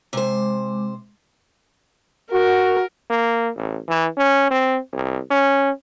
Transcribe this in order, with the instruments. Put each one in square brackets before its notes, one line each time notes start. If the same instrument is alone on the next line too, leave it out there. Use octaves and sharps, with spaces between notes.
[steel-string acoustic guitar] C3 C5 [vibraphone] G#3 D6
[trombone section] F#4 [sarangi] A#4
[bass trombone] A#3
A1
E3
C#4
C4
C2
C#4